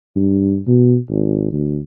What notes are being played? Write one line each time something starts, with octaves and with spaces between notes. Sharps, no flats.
G2
B2
G#1
D2